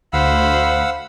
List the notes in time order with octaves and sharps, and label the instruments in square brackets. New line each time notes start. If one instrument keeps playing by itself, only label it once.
[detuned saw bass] D2 [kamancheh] C5 B5 [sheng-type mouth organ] F5 F#5 E6